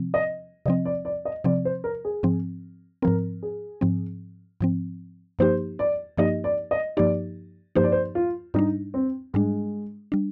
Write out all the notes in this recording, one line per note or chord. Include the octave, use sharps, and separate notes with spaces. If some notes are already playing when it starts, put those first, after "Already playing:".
Already playing: C3 F3 C4
D#5
C3 F3 C4 D#5
D5
D5
D#5
C3 F3 C4 D5
C5
A#4
G#4
G#2 F3 C4
G#2 F3 C4 A#4
G#4
G#2 F3 C4
G#2 F3 C4
G2 F3 A#3 D#4 G4 C5
D5
G2 F3 A#3 D#4 G4 D#5
D5
D#5
G2 F3 A#3 D#4 G4 D5
G2 F3 A#3 D#4 G4 C5
D5
C5
F4
G#2 G3 D4 D#4
C4
G#2 G3 G#3 D4
G3 D4